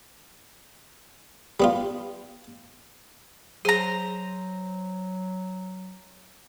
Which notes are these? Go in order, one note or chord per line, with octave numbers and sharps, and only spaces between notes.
G3 B3 F4
F#3 G#4 C5 A#5